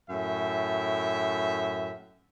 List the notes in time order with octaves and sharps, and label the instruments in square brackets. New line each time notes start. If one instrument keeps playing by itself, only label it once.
[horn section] F#2 A2 E5